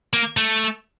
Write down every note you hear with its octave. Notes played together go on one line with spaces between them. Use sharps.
A#3
A3